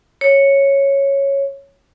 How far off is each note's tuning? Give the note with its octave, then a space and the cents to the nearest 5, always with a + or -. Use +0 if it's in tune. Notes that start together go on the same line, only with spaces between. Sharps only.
C#5 -5